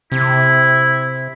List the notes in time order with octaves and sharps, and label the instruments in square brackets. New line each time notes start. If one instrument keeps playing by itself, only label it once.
[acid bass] C3 [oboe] E4